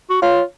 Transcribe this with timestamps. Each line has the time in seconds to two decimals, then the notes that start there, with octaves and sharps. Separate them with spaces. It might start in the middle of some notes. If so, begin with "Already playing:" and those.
0.10 F#4
0.22 F4 C#5 F5